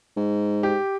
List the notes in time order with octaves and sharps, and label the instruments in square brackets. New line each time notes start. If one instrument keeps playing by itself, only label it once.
[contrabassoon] G#2
[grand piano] G4